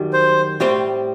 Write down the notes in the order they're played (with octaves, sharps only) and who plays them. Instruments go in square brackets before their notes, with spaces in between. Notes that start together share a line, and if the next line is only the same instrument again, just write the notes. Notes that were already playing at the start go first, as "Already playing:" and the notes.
Already playing: [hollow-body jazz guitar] F#2 D#3 G3
[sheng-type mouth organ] C5
[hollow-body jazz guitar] A2 G3 C4 G4 C5